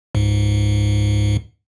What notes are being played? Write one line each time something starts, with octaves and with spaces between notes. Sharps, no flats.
C#2 G#2